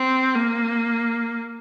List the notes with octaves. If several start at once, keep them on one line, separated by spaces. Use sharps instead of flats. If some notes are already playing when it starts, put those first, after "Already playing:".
Already playing: C4
A#3